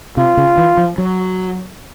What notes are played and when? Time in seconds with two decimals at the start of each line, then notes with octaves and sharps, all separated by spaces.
0.17 C3 F4
0.37 C#3
0.58 E3
0.77 F3
0.98 F#3